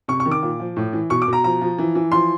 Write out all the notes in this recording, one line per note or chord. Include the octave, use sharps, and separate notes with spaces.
C3 C#6
C#6
D#3
D6
A#2
F3
A2
E3
B2 C#6
D6
B2 A#5
F3 A#5
F3
E3
E3
F3 C6